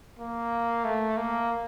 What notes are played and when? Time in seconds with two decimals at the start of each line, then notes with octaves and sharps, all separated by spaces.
0.19 A#3
0.84 A3
1.17 A#3